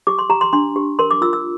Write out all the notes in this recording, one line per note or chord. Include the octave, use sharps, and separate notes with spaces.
G4 D6
C6
G4 A#5
C6
D4 C6
G4
A#4 C6
D6
F4 E6
E6